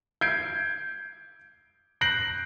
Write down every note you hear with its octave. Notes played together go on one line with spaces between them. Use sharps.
G6 G#6 C7 D7
F#6 G6 A#6 C7 D7 F#7